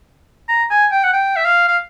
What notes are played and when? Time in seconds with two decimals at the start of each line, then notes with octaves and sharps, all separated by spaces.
0.49 A#5
0.71 G#5
0.92 G5
1.04 F#5
1.13 G5
1.36 E5
1.45 F5
1.68 F5